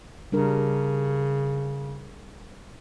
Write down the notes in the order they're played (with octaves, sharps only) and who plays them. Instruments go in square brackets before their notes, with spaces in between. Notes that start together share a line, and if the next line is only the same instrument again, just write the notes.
[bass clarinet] C#3 [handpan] G3 D4 A#4